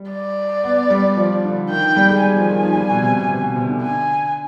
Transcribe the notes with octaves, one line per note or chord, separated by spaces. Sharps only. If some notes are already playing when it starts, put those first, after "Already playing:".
Already playing: G3
D5
B3
G3
F3
D3
D#3 G5
G3
G#3
G3 G#5
F3
D#3
F3
G3
B2
C3
B2
C3
B2
C3
D3
G#5